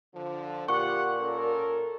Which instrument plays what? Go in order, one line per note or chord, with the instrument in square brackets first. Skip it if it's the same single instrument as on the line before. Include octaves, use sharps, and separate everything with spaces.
[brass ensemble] D3 F3
[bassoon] A#2 [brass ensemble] F4 G4 F#5 [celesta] C#6
[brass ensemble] C#4 A4 A#4